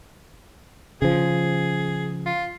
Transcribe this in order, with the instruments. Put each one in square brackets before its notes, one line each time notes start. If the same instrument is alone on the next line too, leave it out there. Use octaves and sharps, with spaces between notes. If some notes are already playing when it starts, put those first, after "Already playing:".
[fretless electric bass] C#3 F3 [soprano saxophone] G#4
[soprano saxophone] F4